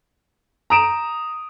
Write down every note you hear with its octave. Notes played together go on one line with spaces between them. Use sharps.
A#5 D#6 D7 E7